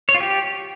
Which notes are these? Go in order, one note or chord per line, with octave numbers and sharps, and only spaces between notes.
C#5
F4
G4